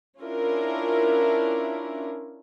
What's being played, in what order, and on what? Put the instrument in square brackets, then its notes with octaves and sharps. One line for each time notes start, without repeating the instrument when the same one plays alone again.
[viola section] C#4 D4 E4 F4 A#4